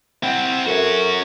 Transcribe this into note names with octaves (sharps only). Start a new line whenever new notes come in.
C4 E4 E5 F#5 G5
C#4 F#4 A4 A#4 E5
D7